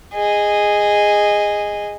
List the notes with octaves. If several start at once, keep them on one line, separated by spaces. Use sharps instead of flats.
G#4 D#5